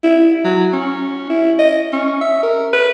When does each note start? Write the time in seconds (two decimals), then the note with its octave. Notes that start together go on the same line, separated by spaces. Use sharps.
0.03 E4
0.44 F#3
0.73 C#4
1.30 E4
1.59 D#5
1.93 C#4
2.21 E5
2.43 A#4
2.73 B4